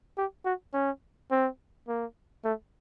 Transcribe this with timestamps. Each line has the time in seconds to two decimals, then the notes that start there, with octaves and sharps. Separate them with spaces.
0.18 G4
0.45 F#4
0.73 C#4
1.31 C4
1.88 A#3
2.44 A3